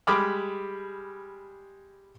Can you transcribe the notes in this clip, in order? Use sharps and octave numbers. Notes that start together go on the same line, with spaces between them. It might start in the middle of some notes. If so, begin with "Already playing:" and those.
G3 G#3 B5 D6 D#6 F6